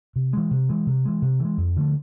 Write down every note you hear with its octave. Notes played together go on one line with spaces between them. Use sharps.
C3
E3 G#3
C3
E3 G#3
C3
E3 G#3
C3
E3 G#3
F2
D3 F3 A3